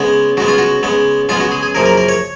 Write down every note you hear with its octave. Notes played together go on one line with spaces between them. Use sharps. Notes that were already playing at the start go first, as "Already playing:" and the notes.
Already playing: C#3 G#3 B3
C#3 G#3 B3 F#4
F4
F#4
C#3 G#3 B3
C#3 G#3 B3 F4
F#4
G#4
G#4
F#2 C#3 F3 A#3 A#4
A#4
A#4
C#5